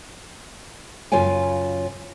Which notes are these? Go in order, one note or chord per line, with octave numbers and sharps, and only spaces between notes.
F#2 C#3 F4 C#5 G5 G#5